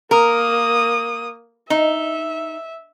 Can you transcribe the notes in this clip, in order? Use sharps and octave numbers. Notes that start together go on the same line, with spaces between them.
A#3 A#4 D#6
D#4 E5